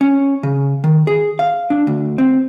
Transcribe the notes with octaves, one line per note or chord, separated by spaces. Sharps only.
C#4
C#3
D#3
G#4
F5
D4
D2
C4